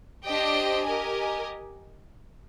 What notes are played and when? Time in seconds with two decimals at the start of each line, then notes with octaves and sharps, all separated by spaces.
0.25 D4 G4 C5 D#5 G5
0.85 G4 A#4 D#5 G#5